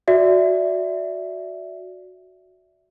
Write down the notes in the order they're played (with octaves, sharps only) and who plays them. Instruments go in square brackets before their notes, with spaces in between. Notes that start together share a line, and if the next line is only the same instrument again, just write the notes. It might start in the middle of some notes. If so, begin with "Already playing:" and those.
[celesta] F#4 D5 E5